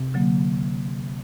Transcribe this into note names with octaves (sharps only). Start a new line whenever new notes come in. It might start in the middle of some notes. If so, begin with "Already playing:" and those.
Already playing: C3
D3 F#3 A#3